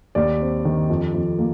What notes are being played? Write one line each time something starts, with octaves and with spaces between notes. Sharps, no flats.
D#2 D5
C4
D#3
F2
F2
A#3